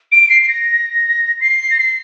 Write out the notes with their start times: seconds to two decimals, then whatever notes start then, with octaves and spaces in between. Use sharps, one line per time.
0.12 D7
0.29 C7
0.42 C7
0.48 A#6
1.41 C7
1.70 A#6
1.78 C7